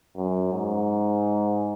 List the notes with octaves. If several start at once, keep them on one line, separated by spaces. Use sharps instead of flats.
F#2
G#2